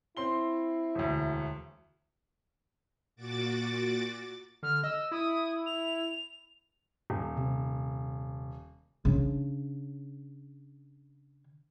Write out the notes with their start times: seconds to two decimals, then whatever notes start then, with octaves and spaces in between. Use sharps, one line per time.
0.17 C4 E4 C6 G7
0.95 E1 D2
3.16 A#2 F#4 D6 A6
4.63 D3 F6
4.84 D#5 E6
5.11 E4 D#6
5.66 F7
7.10 D#1 G4
7.37 C3
9.05 C#3 D4